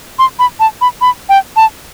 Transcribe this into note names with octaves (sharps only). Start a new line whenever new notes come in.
C6
B5
A5
B5
B5
G5
A5